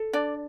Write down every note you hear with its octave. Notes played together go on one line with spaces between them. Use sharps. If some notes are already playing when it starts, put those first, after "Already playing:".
Already playing: A4
D4 D5